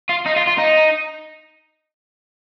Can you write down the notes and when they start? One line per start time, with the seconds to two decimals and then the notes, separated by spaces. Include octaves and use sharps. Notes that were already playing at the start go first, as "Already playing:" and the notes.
0.09 F4
0.26 D#4
0.36 F4
0.47 F4
0.58 D#4